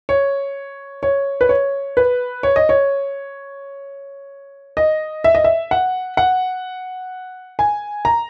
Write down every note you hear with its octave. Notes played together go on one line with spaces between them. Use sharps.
C#5
C#5
B4
C#5
B4
C#5
D#5
C#5
D#5
E5
D#5
E5
F#5
F#5
G#5
A#5